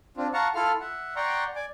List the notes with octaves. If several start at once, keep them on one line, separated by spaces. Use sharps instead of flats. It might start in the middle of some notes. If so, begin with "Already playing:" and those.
C4 D4 F4
F5 F#5 A5 A#5 C#6
E4 F4 A4 F5 F6
E5 F#5
D5 F#5 G5 A#5 C6 C#6
D5 G#5 D6